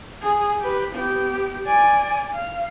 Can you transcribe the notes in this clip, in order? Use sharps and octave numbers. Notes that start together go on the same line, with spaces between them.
G#4
G4 B4
B3 G4
D5 G#5
F5